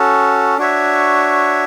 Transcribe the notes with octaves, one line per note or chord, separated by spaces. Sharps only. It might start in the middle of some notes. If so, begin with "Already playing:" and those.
Already playing: C#4 F#4 A4
D4 F#4 C#5 E5